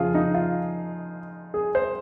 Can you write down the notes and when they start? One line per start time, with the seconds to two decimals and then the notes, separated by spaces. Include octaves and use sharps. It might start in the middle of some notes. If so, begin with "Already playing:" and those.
Already playing: F2 C#3 F3 F4 G#4
0.14 D#4
0.35 F4
1.54 G#4
1.75 C5